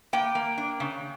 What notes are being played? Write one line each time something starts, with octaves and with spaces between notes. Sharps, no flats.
A#3 G5
A#3
D4
C#3